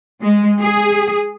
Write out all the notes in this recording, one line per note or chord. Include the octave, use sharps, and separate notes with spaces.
G#3
G#4